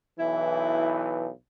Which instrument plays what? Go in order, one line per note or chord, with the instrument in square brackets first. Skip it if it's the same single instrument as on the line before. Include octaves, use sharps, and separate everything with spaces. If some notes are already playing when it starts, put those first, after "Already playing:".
[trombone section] B1 E3 [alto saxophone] E4